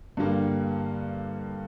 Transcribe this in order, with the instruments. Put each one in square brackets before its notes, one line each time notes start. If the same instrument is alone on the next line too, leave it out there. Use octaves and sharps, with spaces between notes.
[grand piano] G2 D3 G3 A#3